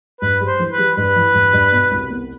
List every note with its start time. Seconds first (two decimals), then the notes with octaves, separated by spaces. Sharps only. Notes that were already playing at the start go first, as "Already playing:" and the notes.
0.21 G2 B4
0.40 G3
0.47 C5
0.59 E3
0.72 B4
0.78 G3
0.97 G2 B4
1.16 E3
1.34 G2
1.53 G2
1.72 B2
1.91 C2
2.10 B3